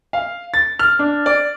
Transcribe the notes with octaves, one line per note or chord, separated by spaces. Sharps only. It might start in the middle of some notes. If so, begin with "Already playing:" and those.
F5
A6
F6
D4
D5